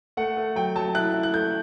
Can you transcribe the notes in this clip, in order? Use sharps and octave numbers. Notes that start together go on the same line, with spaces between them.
A3 F#5
A3
F#3 G5
F#3 A5
E4 F#6
E4
F#6
A3 G6